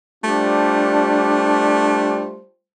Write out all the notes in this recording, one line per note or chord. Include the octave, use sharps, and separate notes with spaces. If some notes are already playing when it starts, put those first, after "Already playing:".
G3 A3 D4 F4 C5